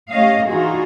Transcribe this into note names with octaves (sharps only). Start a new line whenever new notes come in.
A3 C#4 G4 C#5 D#5 F5
E3 D4 D#4 F4 F#4 G#4